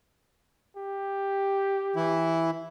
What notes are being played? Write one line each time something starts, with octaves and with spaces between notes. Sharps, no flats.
G4
E3 E4